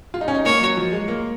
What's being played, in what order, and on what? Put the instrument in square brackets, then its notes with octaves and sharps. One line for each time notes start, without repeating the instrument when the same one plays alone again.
[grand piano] F4
D#4
C#4
D#4
[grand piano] A#3 [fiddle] C#5
[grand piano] F#3
F3
G#3
A#3